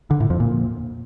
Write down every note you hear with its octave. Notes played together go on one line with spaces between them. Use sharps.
D3
A2
F2
A#2